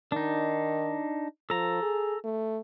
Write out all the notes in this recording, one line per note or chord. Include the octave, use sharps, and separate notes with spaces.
D#3 D4 D#4
F3 A4 A#5
G#4
A3